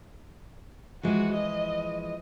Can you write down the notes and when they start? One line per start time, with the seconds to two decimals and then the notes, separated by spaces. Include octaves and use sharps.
1.03 E3 F3 G#3 F#4
1.35 D#5